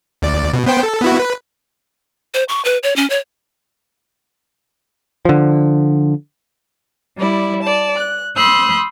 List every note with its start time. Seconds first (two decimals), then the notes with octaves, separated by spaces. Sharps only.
0.22 D2 D5
0.53 B2
0.66 B3 C5 G5
0.83 A4
1.02 B3 E4 F#4
1.19 B4
2.34 C5
2.49 C#6
2.65 B4
2.83 C#5
2.96 C#4
3.10 C#5
5.25 D3 F3
7.17 G3 E4 D5
7.62 D5 A5
7.98 F#6
8.35 B5 C6 D#6 E6 F#6 G6